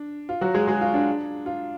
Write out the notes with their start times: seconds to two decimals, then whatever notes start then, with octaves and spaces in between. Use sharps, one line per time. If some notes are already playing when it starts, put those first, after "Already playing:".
Already playing: D4
0.29 F4
0.41 F#3 F#4
0.54 G#3 G#4
0.67 G#3 G#4
0.81 F4
0.94 D4
1.46 F4